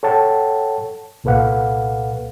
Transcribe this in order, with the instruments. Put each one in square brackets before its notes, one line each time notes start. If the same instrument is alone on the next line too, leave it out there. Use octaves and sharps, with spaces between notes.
[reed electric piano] A4 C#5 F#5 G5 A5
C2 A#2 A4 B4 F5 F#5